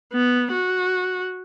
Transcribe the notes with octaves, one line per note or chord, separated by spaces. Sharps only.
B3
F#4